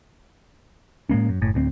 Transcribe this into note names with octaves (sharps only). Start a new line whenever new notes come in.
A2 G#3 A#3 C#4
F#2
F#1 A2
D1 D2 A#3 C4